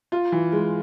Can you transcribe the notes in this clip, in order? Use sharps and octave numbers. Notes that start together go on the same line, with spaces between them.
F4
E3
G#3